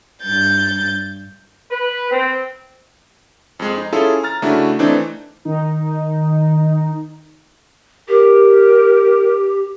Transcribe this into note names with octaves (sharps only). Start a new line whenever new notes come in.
G2 G6 A6
B4
C4
F2 G#3
D#4
C#4 E4 F4 G#4 A4
A#5 F6 A6
C#3 A3 D4 E4 F#4
E3 A3 C4 D4 D#4
D#3 D#4
G4 A#4